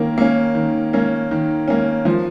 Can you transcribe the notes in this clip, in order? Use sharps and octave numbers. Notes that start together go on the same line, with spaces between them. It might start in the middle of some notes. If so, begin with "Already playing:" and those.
Already playing: D#3 A#3 C#4
A#3 C#4
D#3
A#3 C#4
D#3
A#3 C#4
F3